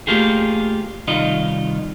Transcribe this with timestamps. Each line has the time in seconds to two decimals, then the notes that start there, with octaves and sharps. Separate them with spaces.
0.07 A3 A#3 F4 G4 G#4
1.08 C2 D#3 F4 D#5